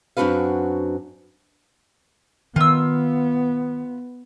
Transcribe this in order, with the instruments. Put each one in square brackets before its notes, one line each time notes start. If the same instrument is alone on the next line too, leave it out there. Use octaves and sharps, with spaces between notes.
[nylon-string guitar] F#2 C4 D4 F#4 B4 F5
[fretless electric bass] D#3 [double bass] B3 [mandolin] F4 E6